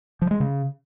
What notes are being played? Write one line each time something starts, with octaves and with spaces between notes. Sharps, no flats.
F3
G#3
C#3